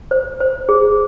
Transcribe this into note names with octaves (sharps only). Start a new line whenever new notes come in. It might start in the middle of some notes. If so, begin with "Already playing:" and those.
C5
C5
G#4